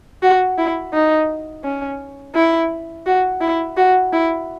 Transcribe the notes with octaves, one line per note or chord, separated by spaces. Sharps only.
F#4
E4
D#4
C#4
E4
F#4
E4
F#4
E4